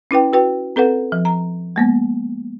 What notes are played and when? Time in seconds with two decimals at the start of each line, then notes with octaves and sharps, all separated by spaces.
0.11 C#4 E4 B4 G5
0.33 F#4 B4 G5
0.76 C4 A4 B4 F#5
1.12 F3
1.25 A#5
1.76 G#3 A#3 B3